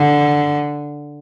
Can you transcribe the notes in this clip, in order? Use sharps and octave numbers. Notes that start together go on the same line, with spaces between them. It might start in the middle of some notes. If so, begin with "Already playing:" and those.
Already playing: D3